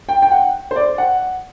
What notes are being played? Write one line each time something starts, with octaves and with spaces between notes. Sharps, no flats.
G5
G5
F#5
C5
D5
F#5